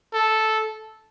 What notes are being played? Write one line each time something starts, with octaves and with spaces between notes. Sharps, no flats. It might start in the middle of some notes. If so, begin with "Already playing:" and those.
A4